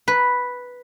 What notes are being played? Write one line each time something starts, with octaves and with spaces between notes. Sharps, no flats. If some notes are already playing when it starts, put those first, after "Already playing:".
B4